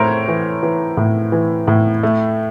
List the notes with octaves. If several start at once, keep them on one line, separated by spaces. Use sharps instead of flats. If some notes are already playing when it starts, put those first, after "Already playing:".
Already playing: A2 A3 A#4 C5 C#5
E3
E3
A2
E3
A2
A3